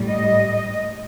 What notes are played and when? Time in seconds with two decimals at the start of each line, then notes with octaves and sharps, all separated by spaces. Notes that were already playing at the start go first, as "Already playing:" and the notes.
Already playing: A2 G3
0.09 D#5